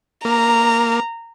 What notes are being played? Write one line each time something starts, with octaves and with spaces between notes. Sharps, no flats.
A#3 A#5